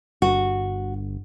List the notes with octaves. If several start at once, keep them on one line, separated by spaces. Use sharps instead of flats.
G1 F#4